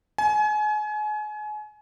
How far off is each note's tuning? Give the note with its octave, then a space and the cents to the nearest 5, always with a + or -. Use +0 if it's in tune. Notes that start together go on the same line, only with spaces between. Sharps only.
G#5 +35